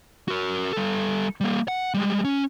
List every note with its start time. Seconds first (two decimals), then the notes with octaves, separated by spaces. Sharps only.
0.28 F#4 A#4
0.73 G3 A4
1.41 G3 A#3
1.68 F#5
1.94 G3 G#3
2.25 C#4